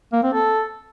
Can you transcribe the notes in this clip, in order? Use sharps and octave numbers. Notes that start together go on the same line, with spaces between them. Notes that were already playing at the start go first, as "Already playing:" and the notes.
A#3
C4
A4